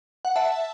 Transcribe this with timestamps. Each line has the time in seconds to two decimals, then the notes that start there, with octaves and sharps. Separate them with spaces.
0.25 F#5
0.36 E5 A5